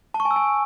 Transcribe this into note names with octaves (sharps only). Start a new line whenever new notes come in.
A5
C#6
G#5
E6
G#5